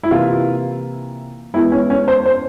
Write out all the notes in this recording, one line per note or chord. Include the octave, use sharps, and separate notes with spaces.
E4
C3 E3 A#3 F4
E2 E3 G#3 E4
C#4
C#4
C5
C5